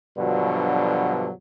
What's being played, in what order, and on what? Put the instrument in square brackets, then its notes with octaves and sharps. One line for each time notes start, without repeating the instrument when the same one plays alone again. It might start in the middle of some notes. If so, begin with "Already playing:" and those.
[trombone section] G2 B2 D3 F3 F#3